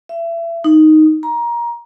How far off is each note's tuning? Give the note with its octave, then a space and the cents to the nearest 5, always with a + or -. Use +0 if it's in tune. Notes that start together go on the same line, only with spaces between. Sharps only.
E5 +30
D#4 +0
A#5 +20